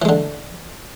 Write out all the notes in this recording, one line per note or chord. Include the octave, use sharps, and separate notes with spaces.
D3 E3 G#3